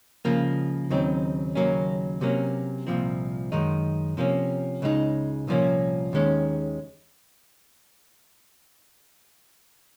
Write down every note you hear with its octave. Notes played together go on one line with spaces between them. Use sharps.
C#2 C#3 F3 A#3
D#2 C#3 F#3 C4 D#4
D#2 C#3 F#3 A#3 C#4
C3 F#3 A#3 C#4
C2 A#2 F3 C4
F#2 D#3 G#3 D#4
C3 F3 A#3 C#4
C#2 C#3 G#3 C4 D#4
C2 A#2 F3 A#3 C#4
D#2 D#3 G#3 C#4